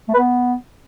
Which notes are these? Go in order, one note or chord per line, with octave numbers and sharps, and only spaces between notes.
A3
B4
B3